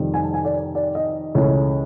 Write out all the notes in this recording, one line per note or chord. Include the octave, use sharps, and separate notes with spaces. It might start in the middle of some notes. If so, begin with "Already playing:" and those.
Already playing: F2 C3 D#3 G3
G#5
A5
G#5
D5
D5
D#5
C#2 C#3 E3 A3 C#4